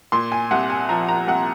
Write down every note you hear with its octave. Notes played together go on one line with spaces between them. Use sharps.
A#2 C6
G#5
C2 F#5
G#5
F3 A#5
A#5
C2 F#5